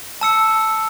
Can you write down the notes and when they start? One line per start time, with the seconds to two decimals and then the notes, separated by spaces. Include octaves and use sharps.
0.21 A5 E6 C#7